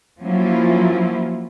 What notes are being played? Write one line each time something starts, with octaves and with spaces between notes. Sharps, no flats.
F3 F#3 A#3 C#4 E4 F4